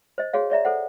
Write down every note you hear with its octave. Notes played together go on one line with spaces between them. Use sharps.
C5 D#5
F#4 G#4 C#5 F5
C#5 D5 E5 A#5
A4 C5 F#5